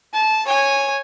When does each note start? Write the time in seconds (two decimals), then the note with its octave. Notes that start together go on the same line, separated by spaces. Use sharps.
0.13 A5
0.46 C#5 G#5